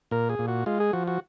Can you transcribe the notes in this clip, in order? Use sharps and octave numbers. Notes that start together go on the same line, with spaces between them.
A#2 A#4
G#4
A#2
F#4
G#3 F4
G#4
F3 F#4
F#4